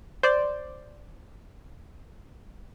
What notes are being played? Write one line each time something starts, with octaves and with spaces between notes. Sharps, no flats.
C5 D5